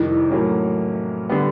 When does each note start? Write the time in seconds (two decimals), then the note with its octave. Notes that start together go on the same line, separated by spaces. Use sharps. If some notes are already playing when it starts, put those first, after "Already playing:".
Already playing: F2 C3 D#3 G3 A#3 E4
0.31 A2 F#3 A#3 C#4
1.29 D3 G3 B3